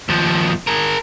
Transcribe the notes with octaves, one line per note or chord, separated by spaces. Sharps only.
D#2 F3
G#4 A#4